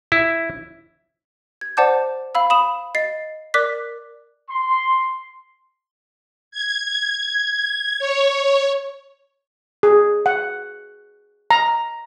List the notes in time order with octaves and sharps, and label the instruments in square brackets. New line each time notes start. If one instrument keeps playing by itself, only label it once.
[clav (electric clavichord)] E4
[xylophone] G#6
C5 D5 F#5 A5 D6 G6
F5 B5 E6
B5 D#6 E7
D#5 A6 C7
A#4 D5 D6 F#6 B6
[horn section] C6
[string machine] G#6
C#5
[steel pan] G#4
F#5
A#5